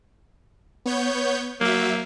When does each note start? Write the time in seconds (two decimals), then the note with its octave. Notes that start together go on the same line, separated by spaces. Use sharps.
0.86 B3 C#5 G6
1.61 F#3 A#3 E5